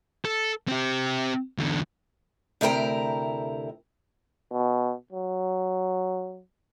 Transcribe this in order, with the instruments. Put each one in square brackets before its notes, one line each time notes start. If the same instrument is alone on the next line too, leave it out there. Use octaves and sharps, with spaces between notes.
[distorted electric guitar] A4
C4 G4
E2 D3
[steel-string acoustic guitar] D2 C3 E4 A#4 G5 A#5
[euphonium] B2
F#3